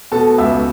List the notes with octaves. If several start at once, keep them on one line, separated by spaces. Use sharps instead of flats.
B2 A4 A5
C#2 E5 E6